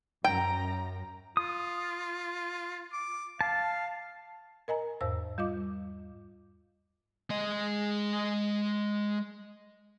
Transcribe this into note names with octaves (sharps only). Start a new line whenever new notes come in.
F#2 G5 A#5
F4 D#6
D6
F5 A5
A#4 D#5 G#5 A#5
E2 G#2 C5 E6
G3 F4 D#5 D6
G#3 D#5